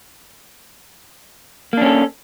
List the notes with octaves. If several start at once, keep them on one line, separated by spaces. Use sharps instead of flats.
A#3 C#4 D4 A4